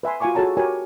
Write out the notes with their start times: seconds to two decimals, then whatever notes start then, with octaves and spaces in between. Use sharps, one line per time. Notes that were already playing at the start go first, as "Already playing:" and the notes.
0.03 B4 E5 G#5 C6
0.20 F4 F#4 F5 G#5 C#6 D6
0.35 F#4 G#4 A4 C#5 A5 A#5
0.57 F#4 G4 A#4 C#5 G#5